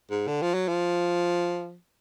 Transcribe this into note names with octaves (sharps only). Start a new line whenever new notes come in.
G#2
D3
F3
F#3
F3